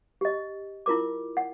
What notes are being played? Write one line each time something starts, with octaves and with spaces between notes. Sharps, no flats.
G4 D#5
E4 F4 A#4 D6
F#5